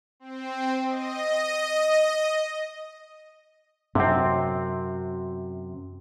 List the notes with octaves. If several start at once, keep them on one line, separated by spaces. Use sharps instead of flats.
C4
D#5
F#2 C3 C4